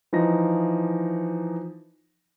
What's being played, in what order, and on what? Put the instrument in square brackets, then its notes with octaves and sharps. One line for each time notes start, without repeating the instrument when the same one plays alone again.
[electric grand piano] E3 F3 D#4 A#6